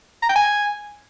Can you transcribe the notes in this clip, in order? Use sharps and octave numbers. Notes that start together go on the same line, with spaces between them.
A#5
G5
G#5